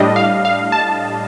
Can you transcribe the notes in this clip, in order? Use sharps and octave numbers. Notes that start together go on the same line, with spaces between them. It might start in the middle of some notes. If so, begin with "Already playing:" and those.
Already playing: A2 G3 D4 D#5
F5
F5
A5